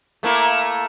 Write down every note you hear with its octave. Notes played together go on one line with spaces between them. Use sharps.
A3 A#3 E4